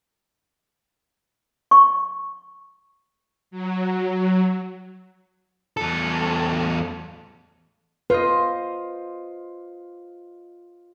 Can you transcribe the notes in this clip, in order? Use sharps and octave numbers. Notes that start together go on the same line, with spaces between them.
C#6
F#3
E2 A4
F4 B4 C5 D#5